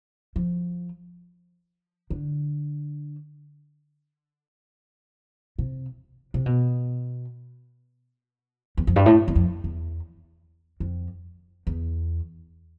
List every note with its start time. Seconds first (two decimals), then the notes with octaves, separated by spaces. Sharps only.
0.36 F3
2.10 D3
5.59 C3
6.34 C3
6.46 B2
8.77 E2
8.87 F2
8.96 G2
9.06 A2
9.28 E2
9.35 F2
9.64 E2
10.80 F2
11.67 E2